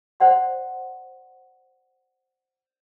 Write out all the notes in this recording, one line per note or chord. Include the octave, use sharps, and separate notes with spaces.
C5 D5 F#5 C6